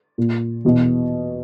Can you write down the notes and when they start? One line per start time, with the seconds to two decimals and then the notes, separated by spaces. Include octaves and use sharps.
0.18 A#2
0.65 E2 B2